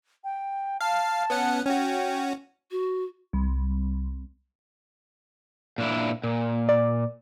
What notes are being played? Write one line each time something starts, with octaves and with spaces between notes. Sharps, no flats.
G5
F5 A5
B3 C#4 F#5
C#4 F#4 G5
F#4
C2
A#2 D4 E4
A#2
D5